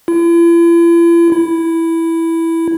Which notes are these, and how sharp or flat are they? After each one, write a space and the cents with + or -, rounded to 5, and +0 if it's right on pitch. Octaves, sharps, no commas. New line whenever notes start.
E4 +45
E4 +0